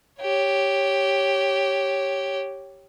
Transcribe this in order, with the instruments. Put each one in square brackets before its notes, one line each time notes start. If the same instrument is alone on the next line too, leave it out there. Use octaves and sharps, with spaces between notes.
[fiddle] G4 C#5